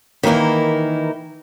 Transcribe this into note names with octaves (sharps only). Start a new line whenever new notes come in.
D#3 E3 A#3 D#4 E4